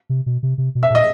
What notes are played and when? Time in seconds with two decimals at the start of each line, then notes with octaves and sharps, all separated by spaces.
0.09 C3
0.26 B2
0.43 C3
0.58 C3
0.75 B2
0.83 E5
0.90 A#2 D#5